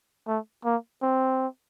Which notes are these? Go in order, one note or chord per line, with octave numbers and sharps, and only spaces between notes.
A3
A#3
C4